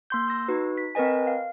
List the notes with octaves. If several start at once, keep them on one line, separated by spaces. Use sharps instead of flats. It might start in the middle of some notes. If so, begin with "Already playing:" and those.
A#3 C6 G6
E6 A#6
D#4 F#4 B4
B6
C4 A#4 B4 D#5 G#5
F5